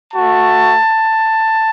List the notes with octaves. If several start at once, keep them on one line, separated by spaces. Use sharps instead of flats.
A3 F#4 A5